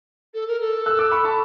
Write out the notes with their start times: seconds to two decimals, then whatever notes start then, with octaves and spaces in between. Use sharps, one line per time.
0.34 A4
0.48 A#4
0.60 A4
0.86 E6 F#6
0.99 D6 E6
1.11 B5 C#6
1.25 A5 B5